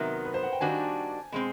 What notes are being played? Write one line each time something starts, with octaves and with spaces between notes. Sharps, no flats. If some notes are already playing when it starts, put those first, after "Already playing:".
Already playing: C3 D#3 F#3 B3 A#4
B4
C5
F#5
G5
D#3 G3 A#3 D4 F#4 G#5
B2 G#3 C4